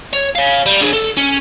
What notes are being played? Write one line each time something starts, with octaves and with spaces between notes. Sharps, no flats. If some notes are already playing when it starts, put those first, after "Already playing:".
C#5
C#5 F5
G3
D4 G#4
A4
C#4